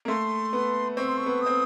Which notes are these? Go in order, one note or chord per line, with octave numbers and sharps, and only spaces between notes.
A#3
A3 C6
B3
C4 C#6
C6
C#6
B3
D#6
C4